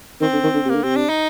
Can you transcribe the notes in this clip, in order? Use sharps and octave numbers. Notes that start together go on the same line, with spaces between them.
D#3 C4
D3
D#3
D3
C3
A#3
D3
C3 C4
D4
D#4